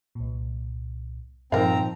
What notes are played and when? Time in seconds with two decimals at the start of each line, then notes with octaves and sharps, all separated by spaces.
0.15 C2 A#2
1.52 G2 A#2 F3 C4 D#4 A#4 F5 A#5